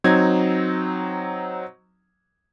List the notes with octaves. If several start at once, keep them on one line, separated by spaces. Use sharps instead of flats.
F#3 C4 D#4 G#6